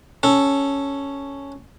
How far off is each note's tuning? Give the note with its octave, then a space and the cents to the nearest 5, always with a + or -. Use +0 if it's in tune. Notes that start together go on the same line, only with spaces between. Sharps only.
C#4 +0 A4 +0